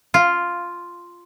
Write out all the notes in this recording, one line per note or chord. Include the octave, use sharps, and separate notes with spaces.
F4